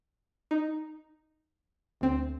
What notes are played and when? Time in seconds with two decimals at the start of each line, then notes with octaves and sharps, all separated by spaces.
0.51 D#4
2.01 D2 C4